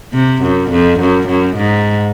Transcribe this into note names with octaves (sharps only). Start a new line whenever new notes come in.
C3
F#2
F2
F#2
F#2
G#2